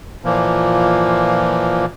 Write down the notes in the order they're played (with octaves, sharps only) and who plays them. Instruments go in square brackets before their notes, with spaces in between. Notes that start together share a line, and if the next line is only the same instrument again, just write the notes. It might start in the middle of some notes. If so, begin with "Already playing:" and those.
[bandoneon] A#2 E3 F3 A#3